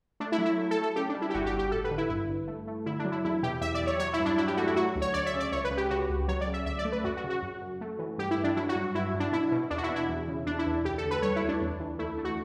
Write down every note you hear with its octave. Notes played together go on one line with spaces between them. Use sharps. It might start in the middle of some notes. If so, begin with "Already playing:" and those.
A3 D4
E4
F#3
E4
A3
A4
A3
A4
C#3 G4
D4
G3
E4
G4
G1 F#4
G4
G1
G4
A1 A4
B4
D3
E4
G2 E4
G2
A3
A3
D3 E4
D4
F#3
E4
E2 E4
B2 G4
E2 E5
D5
E2
C#5
F#3 C#5
E4
G2
D4
F#3 E4
G4
A3 F#4
E4
F#3 F#4
D2
C#5
D2 D5
E5
C#3
D5
C#2 C#5
B4
C#3
G4
C#3 F#4
C#2
F#3 C#5
D5
C#3
E5
D2 E5
D5
A3
B4
F#2 F#4
F#4
C#3
F#4
F#2
F#2
A3
E3
G2 G4
E4
G2
D4
F#3 E4
F#4
G2
G2 E4
G2
D4
B2 E4
B2
E2 D4
F#4
E4
B2
E4
E2
C#3
E2 D4
E4
E2
D2 G4
A4
D2
B4
G3 C#5
E4
D2
D4
E2
E3
A3 E4
A3
F#4